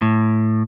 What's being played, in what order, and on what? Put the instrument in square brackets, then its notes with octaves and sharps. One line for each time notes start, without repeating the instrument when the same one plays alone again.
[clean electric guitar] A2